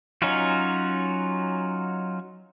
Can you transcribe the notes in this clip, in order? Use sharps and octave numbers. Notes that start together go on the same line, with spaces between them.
F#3 C#4 D#4 F4 F#4